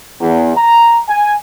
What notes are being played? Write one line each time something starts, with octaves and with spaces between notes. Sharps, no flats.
E2
A#5
G#5